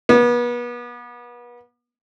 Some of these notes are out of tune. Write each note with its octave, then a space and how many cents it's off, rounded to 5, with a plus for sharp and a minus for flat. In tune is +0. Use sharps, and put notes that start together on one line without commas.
B3 -35